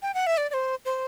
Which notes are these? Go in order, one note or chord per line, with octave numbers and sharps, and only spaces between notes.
G5
F#5
E5
D5
D5
C5
C5